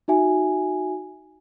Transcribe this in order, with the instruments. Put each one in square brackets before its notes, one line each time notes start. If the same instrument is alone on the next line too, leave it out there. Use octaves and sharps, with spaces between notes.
[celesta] D#4 F#4 E5 G#5